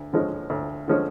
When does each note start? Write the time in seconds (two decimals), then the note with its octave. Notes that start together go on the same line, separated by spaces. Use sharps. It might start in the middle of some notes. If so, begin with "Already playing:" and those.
Already playing: D2
0.13 D3 F3 G#3 C#4
0.50 D2
0.88 D3 F3 G#3 C#4